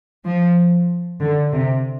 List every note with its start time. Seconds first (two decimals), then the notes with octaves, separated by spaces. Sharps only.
0.25 F3
1.20 D3
1.52 C3